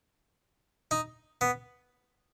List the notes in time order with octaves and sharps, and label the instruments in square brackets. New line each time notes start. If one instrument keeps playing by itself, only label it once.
[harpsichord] D#4
B3